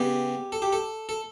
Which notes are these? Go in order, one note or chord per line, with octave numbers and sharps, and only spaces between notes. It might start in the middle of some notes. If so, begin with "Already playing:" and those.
Already playing: C#3 G3 B3 G4
A4
G4
A4
A4